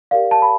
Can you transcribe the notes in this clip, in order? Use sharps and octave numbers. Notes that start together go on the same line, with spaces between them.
G4 A#4 D5 F5
A5
B5